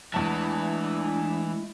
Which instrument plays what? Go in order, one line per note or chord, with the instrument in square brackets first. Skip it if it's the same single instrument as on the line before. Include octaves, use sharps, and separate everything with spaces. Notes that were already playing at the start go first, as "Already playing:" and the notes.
[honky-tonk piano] E2 A5 [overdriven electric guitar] E3 [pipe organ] G#3 A3 E4 [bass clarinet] D4